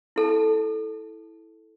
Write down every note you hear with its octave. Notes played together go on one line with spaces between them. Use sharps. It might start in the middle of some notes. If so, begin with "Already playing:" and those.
E4 A4 A5